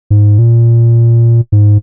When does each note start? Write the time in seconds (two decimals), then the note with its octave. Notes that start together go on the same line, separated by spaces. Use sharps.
0.10 G#2
0.39 A#2
1.52 G#2